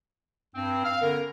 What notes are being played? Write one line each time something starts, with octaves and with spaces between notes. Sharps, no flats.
G2 C4
F5
D3 B3 C#4 A#4